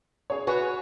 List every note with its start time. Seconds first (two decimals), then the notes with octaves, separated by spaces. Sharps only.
0.30 G#4 C#5
0.47 F#4 B4 C#5 G#5 C#6